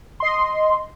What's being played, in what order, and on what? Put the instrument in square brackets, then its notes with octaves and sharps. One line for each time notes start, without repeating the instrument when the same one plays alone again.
[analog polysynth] D#5 C6